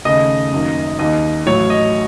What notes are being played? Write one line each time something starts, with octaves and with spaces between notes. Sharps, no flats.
D#2 C#3 A3 D#5
F#2 D#3 A#3
D#2 D#3 A#3 D#5
A1 A2 F#3 C#5
D#5